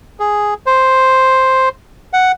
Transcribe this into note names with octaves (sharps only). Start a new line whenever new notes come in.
G#4
C5
F#5